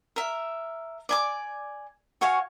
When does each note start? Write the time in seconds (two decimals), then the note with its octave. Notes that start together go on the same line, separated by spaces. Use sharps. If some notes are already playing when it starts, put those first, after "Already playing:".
0.16 A#4 E5
1.09 D5 G#5 D6
2.21 F#4 C#5 F5 G#5